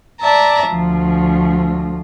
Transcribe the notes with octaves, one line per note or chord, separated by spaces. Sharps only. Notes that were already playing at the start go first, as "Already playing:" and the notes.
D5 E5 A5 A#5
D2 F3